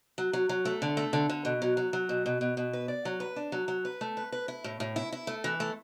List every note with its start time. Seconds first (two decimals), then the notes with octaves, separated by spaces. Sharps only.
0.18 F#3
0.33 F#3
0.49 F#3
0.65 A3
0.82 D3
0.97 A3
1.13 D3
1.29 D3
1.45 B2
1.62 F#3
1.77 F#3
1.93 F#3
2.09 B2
2.26 B2
2.41 B2
2.57 B2
2.73 B4
2.88 D5
3.05 F#3
3.20 B4
3.36 D4
3.52 F#3
3.68 F#3
3.85 B4
4.01 A3
4.17 B4
4.32 B4
4.48 E4
4.64 A2
4.80 A2
4.96 E4
5.12 E4
5.27 A3
5.44 E3
5.60 A3